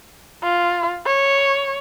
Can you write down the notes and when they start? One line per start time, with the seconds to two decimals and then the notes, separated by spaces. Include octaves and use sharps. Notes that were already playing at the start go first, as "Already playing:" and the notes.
0.43 F4
1.06 C#5